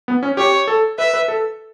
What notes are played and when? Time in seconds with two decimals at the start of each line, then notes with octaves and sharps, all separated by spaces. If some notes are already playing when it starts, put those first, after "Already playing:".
0.08 B3
0.23 C#4
0.37 G4 C#5
0.68 A4
0.98 B4 E5
1.14 B4
1.28 A4